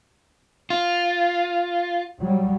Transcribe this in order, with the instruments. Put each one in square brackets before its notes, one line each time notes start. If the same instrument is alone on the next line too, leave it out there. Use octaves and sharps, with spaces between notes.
[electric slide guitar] F4
[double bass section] F#3 G3